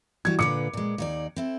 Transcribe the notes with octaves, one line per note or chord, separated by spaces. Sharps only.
E3 G3 F#4 G#6
A#2 D3 B4 D6 C#7
A#2 G#3
D#2 D#4 D5
C4 E4 A4